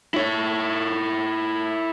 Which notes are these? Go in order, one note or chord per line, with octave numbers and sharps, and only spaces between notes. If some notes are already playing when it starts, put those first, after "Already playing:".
E4 C#5